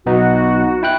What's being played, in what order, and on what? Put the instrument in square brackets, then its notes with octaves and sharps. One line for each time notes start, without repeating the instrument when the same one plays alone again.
[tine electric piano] B1 B3 D#4 [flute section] F#4
[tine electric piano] E4 G5 F#6